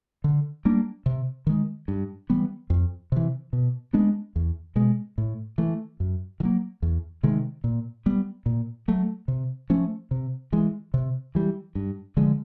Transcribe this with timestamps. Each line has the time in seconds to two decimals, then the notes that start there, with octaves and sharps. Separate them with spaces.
0.24 D3
0.65 G3 A#3 D4
1.06 C3
1.47 D#3 G#3
1.88 G2
2.30 E3 G3 B3
2.70 F2
3.12 C3 E3
3.53 B2
3.93 G#3 B3 D4
4.36 E2
4.76 B2 G#3
5.18 A2
5.58 E3 A3
6.00 F#2
6.40 D#3
6.43 F#3 A#3
6.82 E2
7.23 C3 D#3 G#3
7.64 A#2
8.06 G3 B3
8.46 A#2
8.88 F#3 A3
9.28 C3
9.70 F3 A3 C#4
10.11 C3
10.52 E3 G#3
10.94 C3
11.35 E3 G3
11.75 G2
12.17 D3 F3 G#3